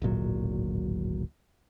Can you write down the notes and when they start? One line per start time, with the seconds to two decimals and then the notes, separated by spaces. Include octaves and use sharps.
0.02 D1 G#1 A#2 F#3